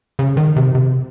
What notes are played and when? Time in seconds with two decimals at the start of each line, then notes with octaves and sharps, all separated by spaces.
0.19 C#3
0.37 D#3
0.56 C3
0.75 C3